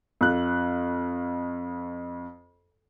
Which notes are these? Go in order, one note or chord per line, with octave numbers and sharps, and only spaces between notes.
F2 F#6